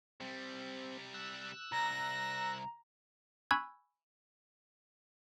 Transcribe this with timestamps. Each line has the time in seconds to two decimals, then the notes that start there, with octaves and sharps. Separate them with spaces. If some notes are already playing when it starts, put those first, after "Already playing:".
0.20 C3 G3 C4
1.14 E6 F#6
1.72 C2 A#5 A#6
3.51 G#5 B5 C#6 E6 F#6 G#6